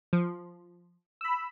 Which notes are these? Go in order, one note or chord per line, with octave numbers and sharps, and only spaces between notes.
F3
B5 E6